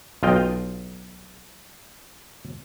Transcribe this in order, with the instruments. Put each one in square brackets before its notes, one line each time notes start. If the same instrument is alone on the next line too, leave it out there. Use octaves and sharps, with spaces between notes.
[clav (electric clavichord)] B1 F4 D#5 G5